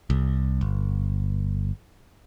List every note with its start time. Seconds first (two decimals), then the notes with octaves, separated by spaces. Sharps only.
0.10 C2
0.61 G1